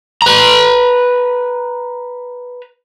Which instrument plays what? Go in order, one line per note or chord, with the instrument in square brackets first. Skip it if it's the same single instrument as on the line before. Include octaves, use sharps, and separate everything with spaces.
[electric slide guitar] B4 A#5